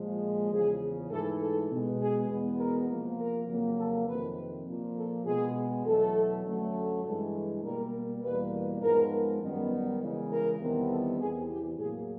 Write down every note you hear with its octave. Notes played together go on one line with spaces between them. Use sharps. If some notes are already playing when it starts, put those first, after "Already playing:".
Already playing: A#2 F3 G#3
E2 C#3 F3 G#4
G#2 E3 A3 A4
A4
B2 G#3 B3
G#4
E2 B2 G#3 B3
A#4
C3 F3 A#3
A#4
F2 C#3 F#3 A#3
A4
F2 C3 D#3 B4
A#2 F3 A#3
A4
B2 G#3 B3 G#4
E2 B2 F#3 A3 A4
F#2 D3 F#3 A3
G2 E3 G#3 A4
B2 G3 A#3 A#4
E2 B2 G3 A#3 B4
G#2 F3 G#3 B3 A#4
F#2 D#3 G3 B3
C#3 E3 G#3
A#4
E2 C3 D#3 G3 B3
A4
E2 C3 E3 G#4
G4
A2 F#3 A#3 G#4